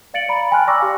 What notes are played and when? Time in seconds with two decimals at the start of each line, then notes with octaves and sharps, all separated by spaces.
0.14 D5 F5 A6 C#7 D7 F#7
0.29 D5 A#5 B5
0.51 G5 G#5 B5 C6 F6 F#6
0.67 D5 A#5 C#6 D6 E6 A#6
0.80 G4 D5 F5